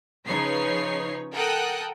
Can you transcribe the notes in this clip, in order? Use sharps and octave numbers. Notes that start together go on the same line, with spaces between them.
C#3 F3 D#4 B4 C#5 C7
A4 A#4 F#5 G5 D#6 F#6